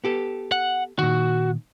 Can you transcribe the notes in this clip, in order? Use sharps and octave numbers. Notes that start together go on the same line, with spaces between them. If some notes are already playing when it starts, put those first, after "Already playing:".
B3 G4 A4
F#5
A#2 D#3 F#4